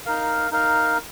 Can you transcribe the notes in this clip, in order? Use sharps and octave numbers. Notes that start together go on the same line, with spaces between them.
D#4 A#4 F5
D#4 A#4 F5